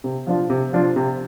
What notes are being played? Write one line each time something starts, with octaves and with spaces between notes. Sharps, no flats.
C3
F3 D4 F4
C3
F3 D4 F4
C3